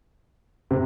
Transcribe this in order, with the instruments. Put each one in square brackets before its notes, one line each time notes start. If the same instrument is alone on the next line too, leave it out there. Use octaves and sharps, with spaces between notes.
[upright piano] C3